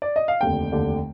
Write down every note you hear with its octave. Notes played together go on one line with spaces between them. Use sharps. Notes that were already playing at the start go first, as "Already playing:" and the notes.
D5
D#5
F5
F1 D#2 D3 G5
F1 D#2 D3